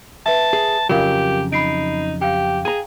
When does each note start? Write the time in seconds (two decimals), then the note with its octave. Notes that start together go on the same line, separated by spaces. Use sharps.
0.26 B4 E5 A5
0.53 G#4
0.89 F2 C#3 F#3 F4 G4 A#4 F5
1.52 D#4 B5 C7 D7
2.21 G4 F5 G5
2.65 G#4 G#5 A#5